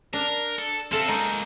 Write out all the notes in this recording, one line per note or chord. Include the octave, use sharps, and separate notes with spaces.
D4 A#4
A4
C4 A4 E5 F5
G#3 A#3 D#4